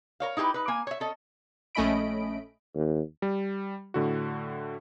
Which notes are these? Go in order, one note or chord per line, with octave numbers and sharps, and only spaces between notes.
A#4 C#5 F5
D#4 E4 G4 G#4 B4
D#4 B4
A#3 G#5
C#5 E5
C#4 A4 D#5
A#1 A3 C#4 D#5 B5 D7
D#2
G3
A2 D3 F#4